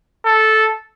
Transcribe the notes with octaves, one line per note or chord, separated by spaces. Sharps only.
A4